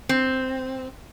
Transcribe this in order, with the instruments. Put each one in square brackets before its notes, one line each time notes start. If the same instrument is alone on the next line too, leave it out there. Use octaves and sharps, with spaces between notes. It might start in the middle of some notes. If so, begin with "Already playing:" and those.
[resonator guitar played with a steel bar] C4